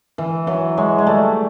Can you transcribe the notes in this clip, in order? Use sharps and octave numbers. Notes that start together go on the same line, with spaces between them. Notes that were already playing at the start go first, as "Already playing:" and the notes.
E3
E3 F#3
F#3 G#3
G#3
G3 A3